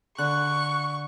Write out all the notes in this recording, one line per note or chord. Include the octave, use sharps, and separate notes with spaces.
D3 C#6 F#6